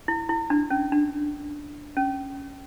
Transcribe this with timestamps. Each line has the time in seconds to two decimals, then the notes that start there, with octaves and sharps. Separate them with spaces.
0.08 E4
0.29 E4
0.50 D4
0.70 C#4
0.92 D4
1.97 C#4